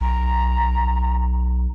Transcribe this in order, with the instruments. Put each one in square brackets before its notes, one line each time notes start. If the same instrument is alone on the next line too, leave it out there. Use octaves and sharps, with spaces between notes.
[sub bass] B1 [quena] A#5